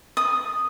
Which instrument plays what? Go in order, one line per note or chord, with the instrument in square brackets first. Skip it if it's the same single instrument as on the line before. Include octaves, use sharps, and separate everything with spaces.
[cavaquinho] D#6